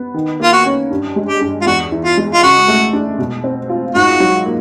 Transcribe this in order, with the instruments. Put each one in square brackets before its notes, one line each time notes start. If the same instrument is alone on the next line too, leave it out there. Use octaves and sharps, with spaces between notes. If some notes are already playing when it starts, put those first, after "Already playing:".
Already playing: [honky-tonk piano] B3
D#3
[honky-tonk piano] A#3 [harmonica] F4
[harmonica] F#4
[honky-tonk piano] C#4
G2
G#3
[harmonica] G4
[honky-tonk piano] G2
[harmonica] F4
[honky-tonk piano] E2 [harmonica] F#4
[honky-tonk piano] E3
[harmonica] F4
[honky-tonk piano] G#3
[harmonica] F4
[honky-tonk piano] C#3 [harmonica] F#4
[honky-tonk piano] A3
D4
B2
C4
F4
[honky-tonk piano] G#2 [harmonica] F#4
[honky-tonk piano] F#3
A#3